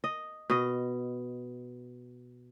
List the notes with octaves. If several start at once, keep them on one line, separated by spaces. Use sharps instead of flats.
D#5
B2 D#5